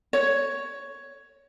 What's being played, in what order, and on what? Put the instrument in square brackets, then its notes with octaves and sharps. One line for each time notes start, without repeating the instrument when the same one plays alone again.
[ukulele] C#5